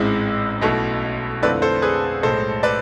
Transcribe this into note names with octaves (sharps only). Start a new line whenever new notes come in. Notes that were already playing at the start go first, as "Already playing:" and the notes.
Already playing: A1 G#2 G#3 C4 E4
B1 B2 A3 E4
F2 D3 A3 C4 E4 B4 D5
A4 C5
G#4 B4
B1 A2 G#3 A4 C5
B4 D5